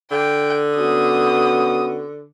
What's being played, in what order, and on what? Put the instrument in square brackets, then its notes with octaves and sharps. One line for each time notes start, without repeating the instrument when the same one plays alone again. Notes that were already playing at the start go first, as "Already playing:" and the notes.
[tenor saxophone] D3 [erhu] G5
[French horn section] B3 C#4 F#4 [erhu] D#6